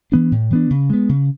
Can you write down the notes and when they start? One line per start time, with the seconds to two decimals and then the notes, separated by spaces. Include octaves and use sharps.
0.12 E3 B3 D4
0.32 A2
0.51 E3 B3 D4
0.70 C#3
0.90 G#3 B3
1.09 C#3